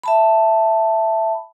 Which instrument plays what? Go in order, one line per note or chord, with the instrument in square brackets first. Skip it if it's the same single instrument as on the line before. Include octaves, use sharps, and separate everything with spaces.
[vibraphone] E5 A5 B5